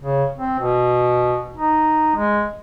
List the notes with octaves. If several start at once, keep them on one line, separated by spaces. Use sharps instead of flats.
C#3
C4
B2
D#4
G#3